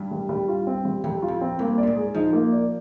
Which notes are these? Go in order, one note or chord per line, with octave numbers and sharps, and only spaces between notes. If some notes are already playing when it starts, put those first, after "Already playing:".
Already playing: G2
G3
G3
F4
C4
G3
F2 G3
F4
F2
C4
G2 A#3
D5
A#2
G#2
G#4
F3 D#4
A#3
D5